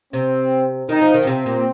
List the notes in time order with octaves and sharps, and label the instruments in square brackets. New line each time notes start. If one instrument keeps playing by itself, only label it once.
[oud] C3 [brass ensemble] C4
[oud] D#3 [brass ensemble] D#4
[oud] F3
D#3
A#2
[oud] C3 [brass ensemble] C4
[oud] A#2